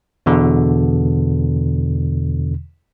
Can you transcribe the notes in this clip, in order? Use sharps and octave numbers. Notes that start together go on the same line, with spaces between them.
E2 B2 D3